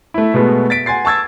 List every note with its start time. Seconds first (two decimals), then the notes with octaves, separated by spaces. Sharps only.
0.14 A3 E4
0.34 B2 G#3 A3 B3
0.70 A6 B6 D7
0.86 F#5 G#5 C6 A6 C7
1.05 A5 C#6 E6 G#6 A6